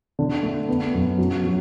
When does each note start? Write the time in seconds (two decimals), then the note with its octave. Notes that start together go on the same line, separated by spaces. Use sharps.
0.19 D3
0.43 A3
0.68 B3
0.94 F#2
1.18 F#3
1.44 F#3